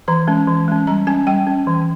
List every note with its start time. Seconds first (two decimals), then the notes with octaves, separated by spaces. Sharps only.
0.08 E3 A#5
0.27 G#3 C#4
0.48 E3
0.68 G#3 C#4
0.87 G3 A#5
1.07 C#4 G#5
1.27 G3 G5
1.47 C#4
1.67 E3